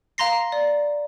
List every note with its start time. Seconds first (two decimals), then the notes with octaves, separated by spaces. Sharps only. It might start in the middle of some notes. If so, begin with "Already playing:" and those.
0.18 F5 A#5 C6 A#6 C7
0.52 D5